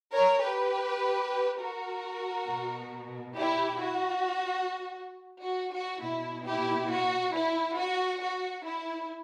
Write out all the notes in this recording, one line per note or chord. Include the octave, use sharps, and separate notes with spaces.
A#4 C#5
G4 B4
F#4 A#4
B2
E4 G4
F#4
F#4
F#4
B2 E4
E4 G4
F#4
E4
F#4
F#4
E4